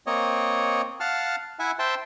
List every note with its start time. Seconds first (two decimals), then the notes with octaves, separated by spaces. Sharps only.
0.07 A#3 C4 C#5 D#5
1.00 F5 F#5 A5 F6
1.59 E4 E5 F#5 G#5
1.79 C5 E5 G5 A5 C6